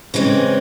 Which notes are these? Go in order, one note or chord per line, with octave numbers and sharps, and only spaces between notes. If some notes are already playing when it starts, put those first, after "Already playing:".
C#3 E3 G#3 C4